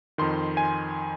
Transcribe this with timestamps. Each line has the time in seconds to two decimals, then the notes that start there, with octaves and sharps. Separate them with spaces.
0.18 F2 D#3 C6
0.57 G#5